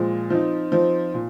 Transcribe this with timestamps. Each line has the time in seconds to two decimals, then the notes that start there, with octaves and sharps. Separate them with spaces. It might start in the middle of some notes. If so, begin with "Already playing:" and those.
Already playing: A#2 F3 G#3
0.30 F3 C4 D#4
0.72 F3 C4 D#4
1.14 A#2